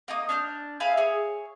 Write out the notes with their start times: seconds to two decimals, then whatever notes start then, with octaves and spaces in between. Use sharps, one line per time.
0.08 A#3 D#4 D#6
0.29 D4 F6 G6
0.80 G#4 B4 E5 F5
0.97 G#4 C#5